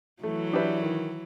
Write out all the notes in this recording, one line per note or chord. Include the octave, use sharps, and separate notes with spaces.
E3 F#3 A3
D4 G4 B4 E5
D#3